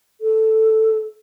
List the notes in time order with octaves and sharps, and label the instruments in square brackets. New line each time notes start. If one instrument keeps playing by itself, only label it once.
[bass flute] A4